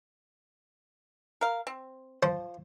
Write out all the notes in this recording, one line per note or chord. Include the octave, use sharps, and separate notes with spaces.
A#4 F5
C4
F3 C5